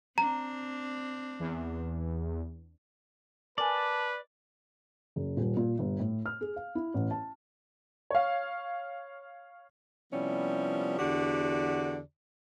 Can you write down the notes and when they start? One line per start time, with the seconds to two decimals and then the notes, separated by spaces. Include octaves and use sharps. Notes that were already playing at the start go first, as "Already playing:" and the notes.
0.18 C4 D4 A#5
1.39 E2
3.58 A#4 B4 D5 G#5 A5
5.16 F#1
5.37 D#1
5.57 A#2
5.79 G1
5.99 A2
6.26 F6
6.41 G#4
6.56 F5
6.75 E4
6.94 A1
7.11 A5
8.11 C#5 F5
10.12 C3 F3 G3 B3 C#4 E4
10.99 E2 D3 F#4 G4 D5